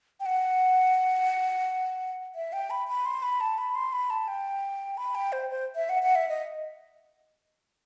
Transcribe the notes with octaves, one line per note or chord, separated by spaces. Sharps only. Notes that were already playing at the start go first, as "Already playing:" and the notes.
G5
F#5
E5
G5
B5
B5
C6
B5
A5
B5
C6
B5
A5
G5
B5
G5
C5
C5
E5
F#5
F#5
E5
D#5